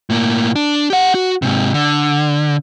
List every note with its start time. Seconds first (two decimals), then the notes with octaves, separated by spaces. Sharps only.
0.10 A2 A#3
0.56 D4
0.90 G4 F#5
1.15 F#4
1.42 G#2 C3
1.74 D3